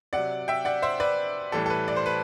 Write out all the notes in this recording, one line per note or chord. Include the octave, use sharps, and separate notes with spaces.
C3 F#3 D5 F#5
E5 G5
D5 F#5
C5 E5
B4 D5
A2 E3 G3 A4
A4
B4
D5
C5
B4